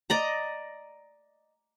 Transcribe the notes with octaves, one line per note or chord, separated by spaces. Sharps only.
D5 D#5 A#5